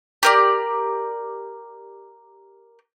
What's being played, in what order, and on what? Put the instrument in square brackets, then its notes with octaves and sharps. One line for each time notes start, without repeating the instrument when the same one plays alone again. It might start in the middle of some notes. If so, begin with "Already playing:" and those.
[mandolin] G4 A#4 D5